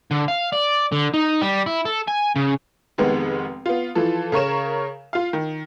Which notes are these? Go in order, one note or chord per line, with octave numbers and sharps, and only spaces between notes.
D3
F5
D5
D3
D#4
G3
E4
A4
G#5
C#3
F1 D#3 G#3 B3
B3 F4
E3 F3 A4
C#3 A#4 C#5 E7
F4 F5
D#3